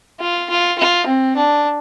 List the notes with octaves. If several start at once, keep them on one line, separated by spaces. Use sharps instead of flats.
F4
F4
F4
C4
D4